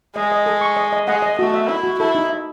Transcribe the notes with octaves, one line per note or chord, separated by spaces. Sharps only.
G#3 D#5
D#5
A4
C#6
D#5
D#5
G#3 F#5
D#5
A3 F#4
E5
E4 E5
F#4
E4 A4
D#4
E5